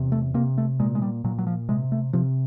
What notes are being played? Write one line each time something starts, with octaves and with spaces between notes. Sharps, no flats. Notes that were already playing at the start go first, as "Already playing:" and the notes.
Already playing: E2 C3
A3
C3 A#3
A3
A#2 G#3
G#3
G3
A#2 F#3
F#3
F3
C3 G#3
A3
C3 F3